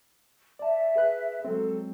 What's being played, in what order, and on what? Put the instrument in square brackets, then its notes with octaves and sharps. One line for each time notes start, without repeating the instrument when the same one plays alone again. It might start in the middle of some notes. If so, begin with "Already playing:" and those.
[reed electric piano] D5 A5 [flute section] E5
[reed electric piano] G#4 B4 F#6
[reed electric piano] F#3 G#3 C4 [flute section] A4